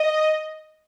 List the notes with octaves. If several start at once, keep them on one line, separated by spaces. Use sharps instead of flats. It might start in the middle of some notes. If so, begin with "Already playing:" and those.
Already playing: D#5